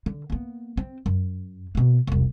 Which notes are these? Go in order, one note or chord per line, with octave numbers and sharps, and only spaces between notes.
D3
A#3 B3
C4
F#2
B2 A#3
E1 C2